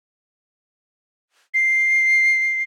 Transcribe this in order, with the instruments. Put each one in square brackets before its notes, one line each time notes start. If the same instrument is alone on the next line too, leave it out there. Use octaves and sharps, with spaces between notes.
[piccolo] C7